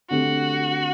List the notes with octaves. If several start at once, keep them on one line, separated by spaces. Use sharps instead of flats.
D3 A3 C4 F#4 G4